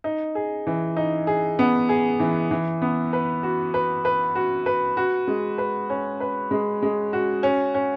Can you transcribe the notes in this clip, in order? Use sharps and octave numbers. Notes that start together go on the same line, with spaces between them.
D#4
G#4
E3
D#4
G#4
B3
G#4
E3
E3
B3
B4
F#4
B4
B4
F#4
B4
F#4
G#3
B4
C#4
B4
G#3
G#3
F#4
C#4
C#4